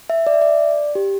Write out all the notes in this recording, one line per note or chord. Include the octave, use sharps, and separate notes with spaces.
E5
D5
E5
D5
G4